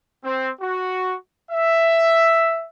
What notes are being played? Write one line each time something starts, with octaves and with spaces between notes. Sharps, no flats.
C4
F#4
E5